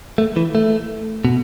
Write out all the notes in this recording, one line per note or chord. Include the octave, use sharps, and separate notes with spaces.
A3
E3
A3
B2